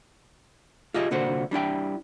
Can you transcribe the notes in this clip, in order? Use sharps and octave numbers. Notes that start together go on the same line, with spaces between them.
F4 G4 G#4 D#5
C2 A#2 D3 F#4 C5
G3 D4 E4 G5